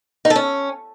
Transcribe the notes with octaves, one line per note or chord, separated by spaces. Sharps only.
D#4
A4
C#4